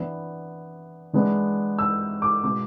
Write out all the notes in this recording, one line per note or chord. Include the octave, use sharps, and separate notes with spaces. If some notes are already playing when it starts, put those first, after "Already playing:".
Already playing: E3 B3 D4
E3 G#3 B3 D4
E6
D6
B2 G#3 B3 D6